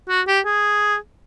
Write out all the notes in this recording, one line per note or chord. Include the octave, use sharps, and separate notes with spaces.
F#4
G4
G#4